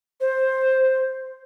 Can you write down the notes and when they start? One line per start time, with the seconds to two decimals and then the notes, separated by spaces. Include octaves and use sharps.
0.21 C5